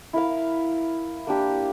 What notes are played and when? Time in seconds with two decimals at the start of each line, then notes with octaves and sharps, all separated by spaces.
0.13 E4 A#4 F5
1.27 A#3 D4 G4